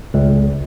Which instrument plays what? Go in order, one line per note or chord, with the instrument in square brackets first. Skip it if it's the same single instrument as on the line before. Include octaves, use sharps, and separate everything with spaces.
[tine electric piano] C#2